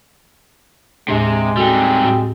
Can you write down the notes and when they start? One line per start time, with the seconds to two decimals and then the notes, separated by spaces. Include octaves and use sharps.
1.08 D#2 A2 C3 G#3 D4
1.57 G3 C4 D#4 F#4 A4
2.03 A2 F#4